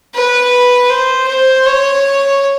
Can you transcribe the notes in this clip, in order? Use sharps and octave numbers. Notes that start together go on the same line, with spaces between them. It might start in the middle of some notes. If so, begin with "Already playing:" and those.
B4
C5
C5
C#5